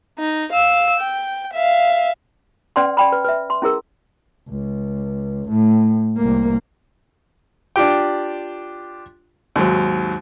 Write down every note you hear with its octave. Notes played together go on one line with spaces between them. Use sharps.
D#4
F5 E6
G5
E5 F5
C#4 B4 D5 F#5 G5 C6
D5 G5 B5
B4
B4 E5
C6
C#4 E4 G#4 A#4 E6
C#2
A2
C2 A#3
D4 F4 G4 G5
D#2 G#2 F#3